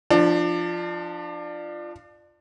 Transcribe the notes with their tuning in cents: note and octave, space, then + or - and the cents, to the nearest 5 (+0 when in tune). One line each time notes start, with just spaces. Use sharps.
F3 -5 D4 +25